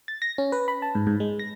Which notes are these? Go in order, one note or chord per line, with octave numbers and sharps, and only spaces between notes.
A6
A#6
C#4
B4
B5
A5
G#2
G#2
G#3
A#6